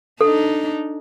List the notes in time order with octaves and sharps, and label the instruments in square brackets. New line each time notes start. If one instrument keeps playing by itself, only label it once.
[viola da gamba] D4 D#4 [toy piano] A4